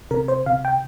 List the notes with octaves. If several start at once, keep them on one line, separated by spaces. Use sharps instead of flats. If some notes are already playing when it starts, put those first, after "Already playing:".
C3 A#4
C5
C3 F5
G5